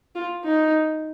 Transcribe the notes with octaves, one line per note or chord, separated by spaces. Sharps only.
F4
D#4